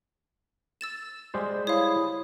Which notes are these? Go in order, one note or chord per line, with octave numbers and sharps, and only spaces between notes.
E6 A6 E7
G3 G#3 C5
E4 C#5 F5 D#6